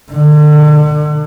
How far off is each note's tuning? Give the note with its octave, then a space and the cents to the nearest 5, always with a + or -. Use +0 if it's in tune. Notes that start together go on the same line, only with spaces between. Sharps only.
D3 +35